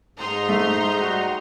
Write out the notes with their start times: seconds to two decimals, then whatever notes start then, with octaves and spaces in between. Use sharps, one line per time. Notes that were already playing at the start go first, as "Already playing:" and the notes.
0.17 G#2 D#4 A#5 C6
0.49 A3
1.01 G3 F#4